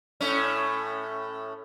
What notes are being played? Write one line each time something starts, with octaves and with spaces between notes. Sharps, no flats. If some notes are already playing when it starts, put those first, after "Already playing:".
A2 A3 C#4